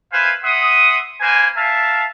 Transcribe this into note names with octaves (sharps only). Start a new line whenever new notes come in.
E4 B4 C5 F5 G#5
E5 F#5 C6 D#6
A#3 B4 C5 G#5
A#4 E5 F5 A5